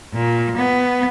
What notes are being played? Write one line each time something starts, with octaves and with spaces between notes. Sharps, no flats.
A#2
B3